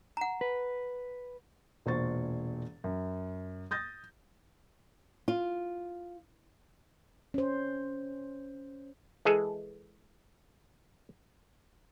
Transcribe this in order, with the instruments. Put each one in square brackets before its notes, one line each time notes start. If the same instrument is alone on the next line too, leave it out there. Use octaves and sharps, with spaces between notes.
[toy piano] F#5 A#5
[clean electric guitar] B4
[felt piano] E1 A#2 C5 C#6 A6
F#2
D#6 G6 A6 A#6
[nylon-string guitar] F4
[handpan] C#4 C5
[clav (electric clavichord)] E3 G#3 G#4 A4